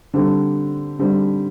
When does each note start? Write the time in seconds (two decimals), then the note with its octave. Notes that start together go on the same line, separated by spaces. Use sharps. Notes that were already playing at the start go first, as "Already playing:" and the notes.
0.14 D3 G3 C4
0.99 D3 G3 C4